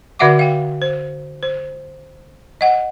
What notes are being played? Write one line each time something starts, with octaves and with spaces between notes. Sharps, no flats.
D3 F#4 D5 E5 F#5 D6
F5 G5
C5
C5
D#5 F#5